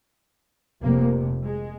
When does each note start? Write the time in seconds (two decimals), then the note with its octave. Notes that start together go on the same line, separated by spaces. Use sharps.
0.82 F1 F2 C3 A#3
1.44 G#3